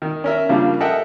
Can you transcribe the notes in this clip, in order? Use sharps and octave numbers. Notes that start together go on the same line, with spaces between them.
D#3
C#4 A#4 E5
C#3 F3 G3 A#3 D4
A4 A#4 D#5 E5 F#5 G5